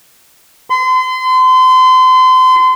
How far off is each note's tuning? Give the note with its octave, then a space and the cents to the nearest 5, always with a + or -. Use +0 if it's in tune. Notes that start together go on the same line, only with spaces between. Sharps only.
C6 -35